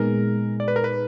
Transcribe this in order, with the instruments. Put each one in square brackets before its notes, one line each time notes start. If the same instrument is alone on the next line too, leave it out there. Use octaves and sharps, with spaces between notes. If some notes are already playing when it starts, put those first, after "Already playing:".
Already playing: [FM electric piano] A#2 G#3 B3 D#4 G#4 [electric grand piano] A#4
[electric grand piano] D5
B4
A#4
B4